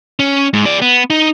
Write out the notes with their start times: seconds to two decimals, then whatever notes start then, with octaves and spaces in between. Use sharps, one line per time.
0.19 C#4
0.53 G#2
0.65 G#4 D5
0.82 B3
1.10 D#4